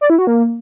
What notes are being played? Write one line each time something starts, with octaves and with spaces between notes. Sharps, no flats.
D5
E4
F#4
A#3